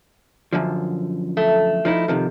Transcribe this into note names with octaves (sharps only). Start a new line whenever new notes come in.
F#2 D3 F3
A3
F3 D#4 E4
C3 D#3 F3